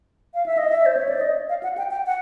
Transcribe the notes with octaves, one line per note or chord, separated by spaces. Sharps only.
F5
E5
D#5
E5
C5
C#5
D5
D#5
F5
F#5
G5
G5
F#5